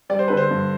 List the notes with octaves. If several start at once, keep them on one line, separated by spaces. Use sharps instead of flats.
G3 D5
C5
D3 B4
C5
G2